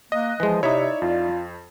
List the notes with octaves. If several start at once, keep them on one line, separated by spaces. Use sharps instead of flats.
A#3 D#5 F#6
E3 F3 G#3
C3 D#4 E4 C#5 D5 E5
F2 F4